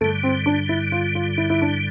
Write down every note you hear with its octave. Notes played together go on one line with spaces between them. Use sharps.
G2 D3 G3 A3
C4
D4
E4
F4
F4
E4
E4
D4